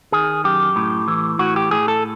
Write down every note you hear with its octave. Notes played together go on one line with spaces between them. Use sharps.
D#3 G#4
F#2 G4
A2
E3
A2 F#4
G4
A2 G#4
A4